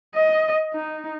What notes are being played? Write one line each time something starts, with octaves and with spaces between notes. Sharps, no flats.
D#5
D#4